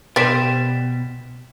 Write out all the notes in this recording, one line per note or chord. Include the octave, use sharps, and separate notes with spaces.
B2 G3 C4 A6 B6 E7